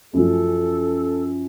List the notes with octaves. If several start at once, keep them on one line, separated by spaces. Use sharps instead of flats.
F#2 F3 C#4 A4